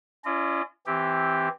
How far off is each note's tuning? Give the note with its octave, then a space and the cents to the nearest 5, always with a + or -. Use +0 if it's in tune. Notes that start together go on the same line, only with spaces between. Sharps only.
C#4 +20 F4 -45 D#5 -40
E3 -10 C4 +0 G4 +0